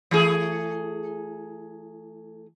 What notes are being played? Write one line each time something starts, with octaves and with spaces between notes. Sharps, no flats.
E3 A3 G#4